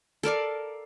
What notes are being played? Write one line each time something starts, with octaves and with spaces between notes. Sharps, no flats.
A4 A#4 D5 F5